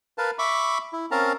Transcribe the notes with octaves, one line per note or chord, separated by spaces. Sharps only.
A#4 B4 F5 A5
E5 B5 C#6 D6
E4
C4 C#4 A#4 F5 A5 A#5